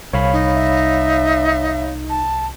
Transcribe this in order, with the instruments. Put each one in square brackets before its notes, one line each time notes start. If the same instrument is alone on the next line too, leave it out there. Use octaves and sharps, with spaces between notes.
[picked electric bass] C2 [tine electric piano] C#5 F5 B5
[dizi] D#4
[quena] E5
A5